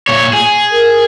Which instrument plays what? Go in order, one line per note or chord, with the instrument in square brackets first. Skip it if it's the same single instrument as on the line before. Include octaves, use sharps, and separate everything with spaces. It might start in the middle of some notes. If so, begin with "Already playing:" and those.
[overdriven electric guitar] A#2 C#5
G#4
[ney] A#4